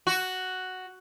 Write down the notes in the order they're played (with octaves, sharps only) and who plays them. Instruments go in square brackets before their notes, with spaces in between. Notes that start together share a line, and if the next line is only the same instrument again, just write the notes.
[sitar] F#4